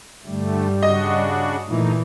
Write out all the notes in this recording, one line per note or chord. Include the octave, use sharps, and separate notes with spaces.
G2 D3 G3 A3
C#3 D4 F#4 D#5
A#2 E3 A3 D#4